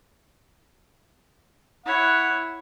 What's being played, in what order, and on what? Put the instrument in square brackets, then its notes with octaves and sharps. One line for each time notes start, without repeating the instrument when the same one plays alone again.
[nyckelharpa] E4 C#5 [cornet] F#5